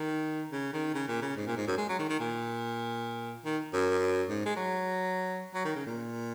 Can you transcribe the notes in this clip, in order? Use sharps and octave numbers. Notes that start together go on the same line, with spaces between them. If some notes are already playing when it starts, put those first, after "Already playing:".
Already playing: D#3
C#3
D#3
C#3
A#2
C#3
G#2
A#2
G#2
F#2
G#3
F#3
D#3
D#3
A#2
D#3
F#2
G#2
G#3
F#3
F#3
D#3
C#3
A#2